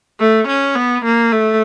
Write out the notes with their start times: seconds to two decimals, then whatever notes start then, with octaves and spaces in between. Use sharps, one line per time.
0.20 A3
0.47 C#4
0.76 B3
1.04 A#3
1.32 A3